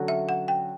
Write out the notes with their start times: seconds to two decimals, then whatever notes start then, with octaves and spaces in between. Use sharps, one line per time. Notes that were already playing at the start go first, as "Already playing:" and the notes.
Already playing: D3 F#3 C#4 F#4
0.08 E5
0.29 F#5
0.48 G5